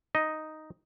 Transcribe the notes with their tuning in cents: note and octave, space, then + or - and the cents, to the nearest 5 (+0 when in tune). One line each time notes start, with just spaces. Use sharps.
D#4 +0 D#5 +0